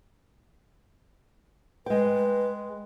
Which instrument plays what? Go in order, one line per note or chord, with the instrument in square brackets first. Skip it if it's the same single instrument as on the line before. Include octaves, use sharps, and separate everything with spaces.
[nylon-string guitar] G#3 G5 [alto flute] B4